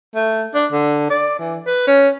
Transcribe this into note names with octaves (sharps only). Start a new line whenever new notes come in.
A3
D4
D3
D5
E3
B4
C#4